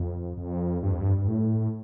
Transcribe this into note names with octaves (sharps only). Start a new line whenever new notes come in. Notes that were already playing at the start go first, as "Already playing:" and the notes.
Already playing: F2
F2
G2
F2
G2
G2
A2